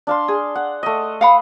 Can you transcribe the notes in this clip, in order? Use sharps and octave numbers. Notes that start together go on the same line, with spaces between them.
D4 F5 C6
G#4
F#5
A3 D#5
F5 F#5 B5